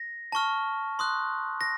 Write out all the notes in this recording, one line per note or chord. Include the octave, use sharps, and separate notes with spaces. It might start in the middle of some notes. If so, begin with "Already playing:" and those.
Already playing: A#6
A5 C#6 F6
C6 D#6 F#6
A#6